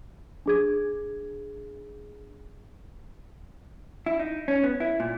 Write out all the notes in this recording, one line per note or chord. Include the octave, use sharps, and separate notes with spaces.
D4 G#4 G#6
E4
D#4
C#4
B3
E4
A#2